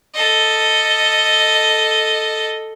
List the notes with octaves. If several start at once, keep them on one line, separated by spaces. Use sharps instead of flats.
A4 D#5